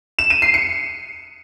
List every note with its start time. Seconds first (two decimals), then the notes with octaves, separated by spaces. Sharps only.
0.19 E7
0.30 D#7
0.42 C7
0.54 C#7